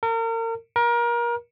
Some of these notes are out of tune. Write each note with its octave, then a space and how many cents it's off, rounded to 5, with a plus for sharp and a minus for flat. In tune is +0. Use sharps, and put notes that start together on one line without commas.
A#4 -35
A#4 +30